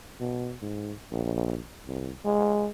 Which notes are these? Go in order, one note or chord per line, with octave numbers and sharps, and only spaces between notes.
B2
G#2
A#1
C2
G#3